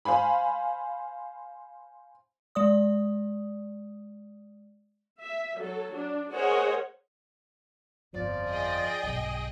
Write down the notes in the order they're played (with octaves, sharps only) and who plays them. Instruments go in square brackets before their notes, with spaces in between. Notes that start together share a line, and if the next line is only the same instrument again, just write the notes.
[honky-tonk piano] C5 F5 G#5 B5
[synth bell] G#3 D5 D#6
[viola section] E5
F#3 A4
D4
G#4 A#4 C5 C#5 D#5 F#5
[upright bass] G1 F2 [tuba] F3 [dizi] D5
[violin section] G#4 D#5 G5
[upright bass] B1 G2